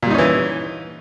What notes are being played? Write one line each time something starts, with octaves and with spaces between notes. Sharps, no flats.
A#2 E3 G3 C#4 D#4